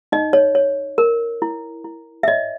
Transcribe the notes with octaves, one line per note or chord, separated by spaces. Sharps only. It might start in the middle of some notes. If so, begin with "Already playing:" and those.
D#4 D#5
C#5
C#5
A#4
E4
E4
E5
C#5 D#5